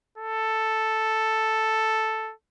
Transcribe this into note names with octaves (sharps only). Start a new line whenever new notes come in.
A4